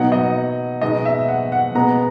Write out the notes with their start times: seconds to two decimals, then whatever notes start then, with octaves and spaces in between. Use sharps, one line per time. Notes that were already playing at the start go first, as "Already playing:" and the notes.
Already playing: B2 F#3 B3 D#4 F#5
0.12 D#5
0.82 B2 G#3 B3 D#4 D#5
1.05 E5
1.28 F#5
1.52 F#5
1.75 B2 G#3 B3 A#5